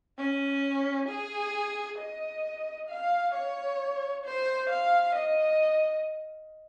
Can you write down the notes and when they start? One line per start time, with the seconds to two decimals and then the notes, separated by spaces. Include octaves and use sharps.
0.18 C#4
1.08 G#4
1.99 D#5
2.89 F5
3.34 C#5
4.25 C5
4.70 F5
5.15 D#5